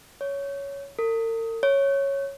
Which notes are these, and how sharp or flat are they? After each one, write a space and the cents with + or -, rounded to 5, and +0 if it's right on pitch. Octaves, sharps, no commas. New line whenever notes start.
C#5 +10
A#4 -45
C#5 -5